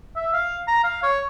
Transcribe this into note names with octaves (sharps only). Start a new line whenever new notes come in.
E5
F5
A#5
F5
C#5